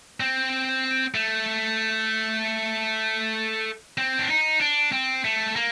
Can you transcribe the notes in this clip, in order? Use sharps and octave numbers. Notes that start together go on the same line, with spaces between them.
C4
A3
C4
D4
D#4
D4
C4
A3
A#3